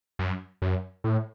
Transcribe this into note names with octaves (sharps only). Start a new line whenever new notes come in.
F#2
F#2
A2